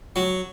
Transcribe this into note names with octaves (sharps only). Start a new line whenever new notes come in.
F#3